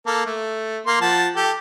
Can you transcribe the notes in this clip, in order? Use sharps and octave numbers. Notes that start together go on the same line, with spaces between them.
A#3 A4
A3
A#3 C6
F3 F#5 A5
G4 A4